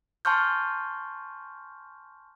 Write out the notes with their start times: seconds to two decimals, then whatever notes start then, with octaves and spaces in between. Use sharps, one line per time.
0.25 G#5 A5 C6 C#6 F6 G6